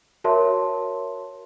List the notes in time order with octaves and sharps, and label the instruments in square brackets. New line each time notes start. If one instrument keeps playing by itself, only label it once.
[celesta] F#4 A#4 C#5 E5 A5 C6